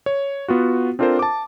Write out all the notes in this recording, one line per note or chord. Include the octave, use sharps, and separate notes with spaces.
C#5
B3 F4 F#4
C4 D4 F4 A4 A#4 C5
A5 D6